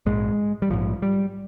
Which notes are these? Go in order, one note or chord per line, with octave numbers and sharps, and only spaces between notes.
A#1 G#2 G#3
G3
A#1 G#2 F3
G3